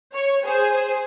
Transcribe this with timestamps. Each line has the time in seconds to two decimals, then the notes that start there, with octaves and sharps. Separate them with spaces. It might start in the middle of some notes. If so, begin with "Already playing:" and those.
0.14 C#5
0.46 G#4 C5